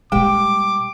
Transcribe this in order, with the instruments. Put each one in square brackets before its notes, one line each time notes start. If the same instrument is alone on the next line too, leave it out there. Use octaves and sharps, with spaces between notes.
[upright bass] A#2 G3 [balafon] G#3 [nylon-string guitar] G4 G5 [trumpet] D6